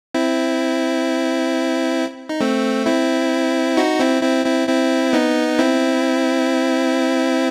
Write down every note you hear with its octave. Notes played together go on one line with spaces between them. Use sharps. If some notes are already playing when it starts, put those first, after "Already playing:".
C4 E4
D#4
A3 C4
C4 E4
D#4 F#4
C4 E4
C4 E4
C4 E4
C4 E4
B3 D#4
C4 E4